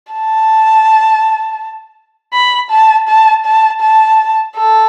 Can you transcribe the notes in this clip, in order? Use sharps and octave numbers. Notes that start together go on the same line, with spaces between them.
A5
B5
A5
A5
A5
A5
A4